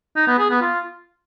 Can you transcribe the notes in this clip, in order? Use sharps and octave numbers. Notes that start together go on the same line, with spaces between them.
D#4
B3
G#4
B3
F4